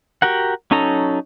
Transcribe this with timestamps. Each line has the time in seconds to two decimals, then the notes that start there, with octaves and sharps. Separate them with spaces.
0.22 F#4 G4 A#4 F#5
0.71 F#3 C#4 D#4 A4 A#5